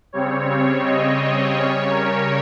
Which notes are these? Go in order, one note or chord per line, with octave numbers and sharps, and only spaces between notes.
C#3 G3 C4 C#5
C#5
D#5
D#5
C#3 G3 C#4 C#5
A#4